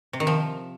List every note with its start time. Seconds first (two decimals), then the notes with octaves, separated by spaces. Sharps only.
0.13 C3
0.20 D#3
0.27 F3